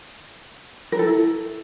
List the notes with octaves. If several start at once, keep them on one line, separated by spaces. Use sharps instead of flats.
A#4
A4
E4